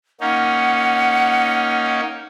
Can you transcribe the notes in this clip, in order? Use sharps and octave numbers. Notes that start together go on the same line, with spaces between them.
A#3 C#4 D#4 F#5